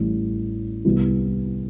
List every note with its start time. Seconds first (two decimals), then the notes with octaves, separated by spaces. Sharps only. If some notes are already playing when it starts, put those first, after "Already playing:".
Already playing: A1 A2 G3
0.85 C2 C3 G3 B3 E4